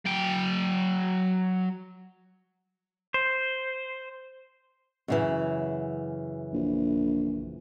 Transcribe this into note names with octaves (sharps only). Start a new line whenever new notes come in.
F#3 G5
C5
F#2 C#3 E3
A#1